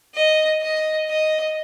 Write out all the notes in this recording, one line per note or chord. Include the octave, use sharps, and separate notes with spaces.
D#5
D#5
D#5